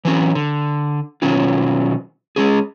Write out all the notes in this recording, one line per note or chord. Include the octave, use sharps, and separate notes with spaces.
E3 F#3 C#4
D3
B2 D#3 F#3 C#4 F4
G#3 C#4 G#4